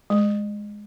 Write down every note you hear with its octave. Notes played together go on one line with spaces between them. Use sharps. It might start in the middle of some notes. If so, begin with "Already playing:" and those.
G#3